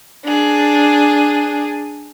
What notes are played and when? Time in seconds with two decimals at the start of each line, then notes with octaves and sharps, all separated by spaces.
0.25 D4 G#4